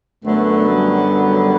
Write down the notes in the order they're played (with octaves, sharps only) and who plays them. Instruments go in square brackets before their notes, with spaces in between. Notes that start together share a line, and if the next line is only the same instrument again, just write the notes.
[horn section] F#2 D3 F#3 B3 [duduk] A3
[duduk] G3